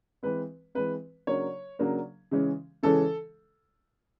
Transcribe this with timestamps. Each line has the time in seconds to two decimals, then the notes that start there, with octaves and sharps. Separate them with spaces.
0.23 E3 G#3 C4 B4
0.75 E3 G#3 C4 B4
1.27 C#3 F#3 A#3 D4 C#5
1.79 C#3 F#3 A#3 D4
2.31 C#3 E3 G#3 C#4
2.83 C#3 E3 G#3 C#4 A4